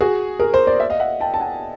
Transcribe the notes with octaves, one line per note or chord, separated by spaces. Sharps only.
F#4 G#4
G#4 A#4
A#4 C5
C5 D5
D5 E5
D#5 F5
E5 F#5
G5 A5
A5
F#5 G#5